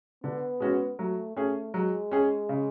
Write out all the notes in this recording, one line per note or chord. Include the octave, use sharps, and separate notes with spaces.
D3 B3
G#3 C#4 F#4
F#3 A3
A3 C#4 G#4
F#3 G#3
C#4 G#4
C#3